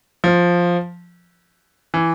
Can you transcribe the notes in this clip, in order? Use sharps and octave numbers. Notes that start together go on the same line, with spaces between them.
F3
E3